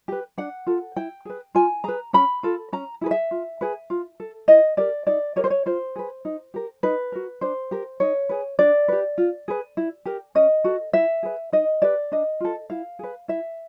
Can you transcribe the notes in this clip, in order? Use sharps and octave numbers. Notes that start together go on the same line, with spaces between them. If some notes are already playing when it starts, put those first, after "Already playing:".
G4 B4
D4 F#5
F4 A4
E4 G5
G#4 B4
F4 G#5
G#4 B4 A#5
C#4 B5
F4 A4
C#4 A#5
E4 G#4 B4
E5
F4
G#4 B4
F4
A4
E4 D#5
G4 A#4 D5
D#4 D5
G4 A#4 C#5
C5
C#5
F4 C5
G#4 B4
D#4
G4 A#4
D#4 B4
F#4 A#4
D4 C5
G4 A#4
D#4 C#5
G#4 B4
D4 D5
G4 B4
F4
G#4 B4
E4
G4 A#4
C#4 D#5
F#4 A4
E4 E5
G#4 B4
D#4 D#5
G4 B4 D5
D4 D#5
F4 A4
E4 F5
G#4 B4
E4 E5